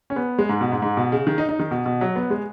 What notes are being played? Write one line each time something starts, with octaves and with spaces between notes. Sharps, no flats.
C#4
B3
G#3
G#2
B2
G#2
G#2
B2
C#3
D#3
D#4
D#4
D#3
B2
B2
F#3
B3
G#3